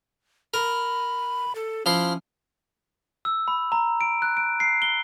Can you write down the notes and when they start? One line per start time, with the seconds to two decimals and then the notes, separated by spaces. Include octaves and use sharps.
0.54 A#4 B5
1.55 A4
1.86 F3 C#4 E4 C6
3.25 E6
3.48 B5
3.72 A#5
4.01 D7
4.22 F#6
4.37 D7
4.60 C7
4.82 G7